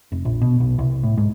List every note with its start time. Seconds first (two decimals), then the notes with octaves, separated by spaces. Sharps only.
0.12 F1
0.25 A#1
0.41 B2
0.60 B1
0.78 C2
1.03 A2
1.18 G#2